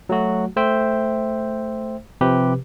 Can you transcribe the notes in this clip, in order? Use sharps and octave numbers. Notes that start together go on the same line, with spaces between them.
F#3 A3 F#4
A3 C5 E5 G5
C3 F3 G4 B4